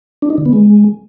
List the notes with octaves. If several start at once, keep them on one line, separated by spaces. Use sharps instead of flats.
D4
D#4
D3
B3
G#3